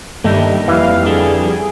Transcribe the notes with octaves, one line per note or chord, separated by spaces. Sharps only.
G2 D#3 G3 A3 A#3 D#5
F2 E3 G3 F5
D4 G#4 A4